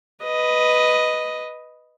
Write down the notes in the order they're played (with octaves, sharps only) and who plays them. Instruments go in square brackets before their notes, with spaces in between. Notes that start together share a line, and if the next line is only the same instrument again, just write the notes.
[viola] B4 D#5